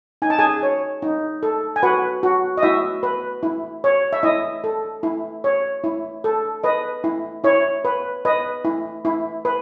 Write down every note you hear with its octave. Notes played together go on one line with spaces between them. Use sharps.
D#4 G#5
A5
G#4 G#5
C#5
D#4
A4
G#5
F#4 B4 F#5
F#4
D#5
E4 F#4 E5
B4
E4
C#5
E5
E4 D#5
A4
E4
C#5
E4
A4
B4 D#5
E4
E4 C#5
B4
B4 D#5
E4
E4
B4